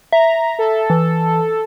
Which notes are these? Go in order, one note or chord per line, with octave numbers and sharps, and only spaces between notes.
E5 A#5
A4
E3